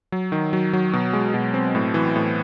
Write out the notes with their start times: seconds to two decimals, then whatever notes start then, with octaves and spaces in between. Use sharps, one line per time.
0.12 F#3
0.32 D#3
0.53 F#3
0.73 F#3
0.93 B2
1.13 G#3
1.34 B2
1.54 C4
1.75 A2
1.94 E3
2.16 A2